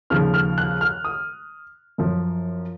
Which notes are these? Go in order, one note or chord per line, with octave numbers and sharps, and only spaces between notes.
D#2 C#3 F3 F6
F6
F#6
F6
D#6
F#2 F3